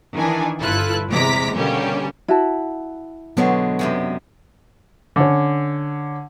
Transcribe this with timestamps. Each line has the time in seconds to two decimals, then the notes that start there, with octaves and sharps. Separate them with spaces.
0.15 D#3 E3 D4 G#5
0.60 G1 E4 F4 A4 B4 F#6
1.10 E2 C3 G#3 A#5 D6 B6
1.55 B2 D3 G3 A#3 C#4 G4
2.28 E4 F#4 A5
3.37 B2 D3 F#3 G#3 B3 C#5
3.79 F#2 C3 G#3
5.16 D3 C#4